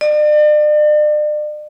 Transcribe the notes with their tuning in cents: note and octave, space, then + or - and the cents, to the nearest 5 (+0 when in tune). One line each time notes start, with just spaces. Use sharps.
D5 +40